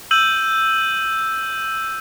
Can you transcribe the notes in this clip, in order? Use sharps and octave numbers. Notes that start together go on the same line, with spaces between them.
E6 G6 D#7 F#7